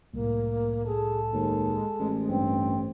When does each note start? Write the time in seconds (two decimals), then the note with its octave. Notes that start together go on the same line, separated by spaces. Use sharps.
0.14 C2 A2 A#3
0.86 G#4 A4
1.33 D#2 G#3
2.00 A1
2.29 G2 C4